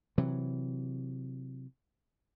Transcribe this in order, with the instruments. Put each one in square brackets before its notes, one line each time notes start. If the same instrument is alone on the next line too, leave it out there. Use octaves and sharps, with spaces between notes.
[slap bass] C3 E3 F#3